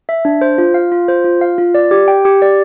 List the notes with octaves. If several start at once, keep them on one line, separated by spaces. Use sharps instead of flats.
E5
D4
C5
F4
F5
F4
C5
F4
F5
F4
D5
G4
G5
G4
D5